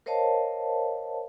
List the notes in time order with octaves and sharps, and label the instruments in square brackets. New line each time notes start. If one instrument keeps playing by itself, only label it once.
[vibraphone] A#4 C5 C#5 D#5 F5 A5